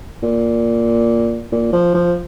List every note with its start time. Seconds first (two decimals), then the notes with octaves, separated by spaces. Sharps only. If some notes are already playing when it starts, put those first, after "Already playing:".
0.23 A#2
1.52 A#2
1.73 F3
1.94 F3